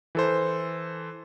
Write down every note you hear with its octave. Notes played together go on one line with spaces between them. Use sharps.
E3 A4 C5